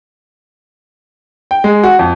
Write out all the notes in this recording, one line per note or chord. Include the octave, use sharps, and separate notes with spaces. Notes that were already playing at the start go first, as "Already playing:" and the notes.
G5
G#3
F#4
F2